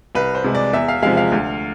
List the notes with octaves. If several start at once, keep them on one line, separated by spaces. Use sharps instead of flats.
C2 B4
C5
C3 G#3
D5
E2 E5
F5
C3 F3 G#3 F5
F5
D2